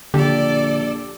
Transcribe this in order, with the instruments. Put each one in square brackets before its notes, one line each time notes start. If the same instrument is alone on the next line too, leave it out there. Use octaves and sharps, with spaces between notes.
[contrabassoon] A#1 [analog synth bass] D3 [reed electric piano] G4 [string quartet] A4 D5